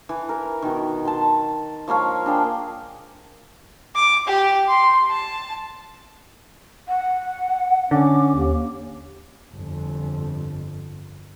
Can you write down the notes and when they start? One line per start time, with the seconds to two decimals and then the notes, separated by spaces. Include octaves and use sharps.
0.09 E3
0.29 A#4
0.62 B2 D#3
1.05 A5 C6
1.88 F3 A#3 C#5 F5
2.26 D4 G#4 G5
3.95 D6
4.27 G4
4.68 C6
5.10 A5
6.88 F#5
7.91 D3 C#4 D6
8.35 D#2
9.52 G1 F2